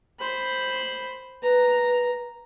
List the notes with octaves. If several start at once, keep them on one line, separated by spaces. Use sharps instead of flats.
C5 B5
B4 A#5